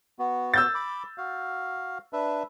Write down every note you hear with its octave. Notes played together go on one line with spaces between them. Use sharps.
B3 F#4
E6 G6 A6
B5 D6
F#4 F5
D4 B4 E5